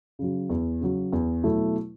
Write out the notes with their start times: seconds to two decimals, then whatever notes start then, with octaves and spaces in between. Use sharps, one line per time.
0.19 C#3 F#3
0.50 E2
0.81 C#3 F#3
1.13 E2
1.44 B2 F#3 A3 E4